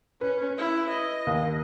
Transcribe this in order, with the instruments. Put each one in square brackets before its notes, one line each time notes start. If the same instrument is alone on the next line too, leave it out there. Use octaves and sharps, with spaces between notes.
[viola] C#4 [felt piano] B4
[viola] E4
D#5
[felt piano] D#2